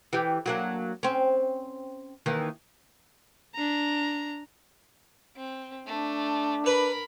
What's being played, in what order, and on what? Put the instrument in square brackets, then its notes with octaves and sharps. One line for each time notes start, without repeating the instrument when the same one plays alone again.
[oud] E3 G4
F#3 A#3 D4
C4 C#4
D#2 D#3 E3
[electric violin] D4 A#5
[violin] C4
[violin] A3 [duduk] D4
[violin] A#4 B5 [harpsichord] B4